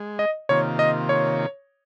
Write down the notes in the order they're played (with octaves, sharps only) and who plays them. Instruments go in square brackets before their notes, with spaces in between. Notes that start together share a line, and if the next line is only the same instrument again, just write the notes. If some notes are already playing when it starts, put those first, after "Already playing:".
Already playing: [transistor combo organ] G#3
[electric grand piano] D#5
[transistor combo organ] C3 D#3 A#3 F4 [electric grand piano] C#5
[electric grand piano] D#5
C#5